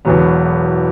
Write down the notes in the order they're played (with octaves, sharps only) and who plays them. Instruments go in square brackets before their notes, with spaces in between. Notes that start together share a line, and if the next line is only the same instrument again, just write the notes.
[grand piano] E1 E2 B2 F#3 B3